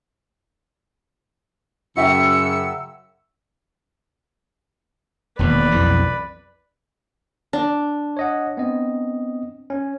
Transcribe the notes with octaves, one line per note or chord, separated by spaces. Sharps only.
F#2 C#3 F#4 E5 G5 E6 C#7
E1 D#2 B2 B4 D5
B1 F2 E3
D4
C#5 D#5 F#5
B3 C4 D#5
C#4